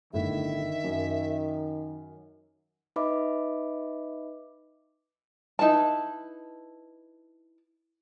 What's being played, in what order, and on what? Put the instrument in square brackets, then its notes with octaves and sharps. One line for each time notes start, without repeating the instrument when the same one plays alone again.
[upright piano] G1 A2 [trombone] D#3 [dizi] E5
[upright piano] F#2
[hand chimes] D#4 B4 D#5 E5 B5 D6
[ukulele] D#4 E4 B4 A5